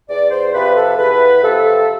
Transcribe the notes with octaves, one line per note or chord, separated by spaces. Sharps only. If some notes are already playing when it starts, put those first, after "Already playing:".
E2 D5
C5
C3 F3 B4
A4
E2 B4
C3 F3 A4